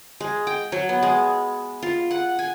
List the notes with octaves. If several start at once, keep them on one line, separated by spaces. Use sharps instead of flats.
G#3
G5
F#3
B3
G#3
F4
F#5
G#5